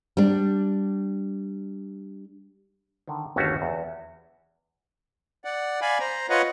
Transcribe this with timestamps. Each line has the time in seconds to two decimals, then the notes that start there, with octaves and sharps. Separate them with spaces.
0.17 G3 D4
3.08 D3 D#3
3.36 G1 D#2 A3 C#4 F#4 F5
3.62 E2
5.45 D5 F#5
5.82 D5 F5 G#5 B5
6.00 C5 A#5
6.30 F4 B4 C#5 D#5 F#5